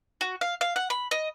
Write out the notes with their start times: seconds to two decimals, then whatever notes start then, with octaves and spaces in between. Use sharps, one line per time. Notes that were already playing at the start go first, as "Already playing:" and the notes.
0.21 F#4
0.41 F5
0.61 F5
0.76 F#5
0.90 B5
1.11 D#5